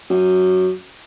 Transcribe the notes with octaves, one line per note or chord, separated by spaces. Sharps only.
F#2